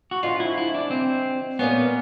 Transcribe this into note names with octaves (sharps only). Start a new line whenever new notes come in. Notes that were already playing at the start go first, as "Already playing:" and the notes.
F#4
D3 F3 G#3 F4
E4
E4
D4
C4
A#2 G3 A#3 B3 C#4